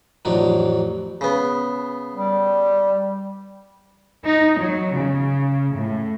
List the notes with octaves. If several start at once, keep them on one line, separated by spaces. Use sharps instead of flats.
A1 F2 F3 F#3 D4 D#4
C#3 B3
G3
D#4
F#3
C#3
A2